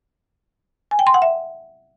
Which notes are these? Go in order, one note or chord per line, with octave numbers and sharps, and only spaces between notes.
G#5
G5
C6
F#5
E5